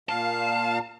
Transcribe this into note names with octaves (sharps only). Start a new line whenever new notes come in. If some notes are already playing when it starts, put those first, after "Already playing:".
A#2 F5 A5